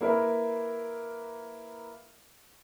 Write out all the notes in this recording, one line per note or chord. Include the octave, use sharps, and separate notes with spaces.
A#3 E4 A#4 B4